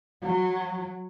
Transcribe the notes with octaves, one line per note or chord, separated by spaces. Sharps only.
F#3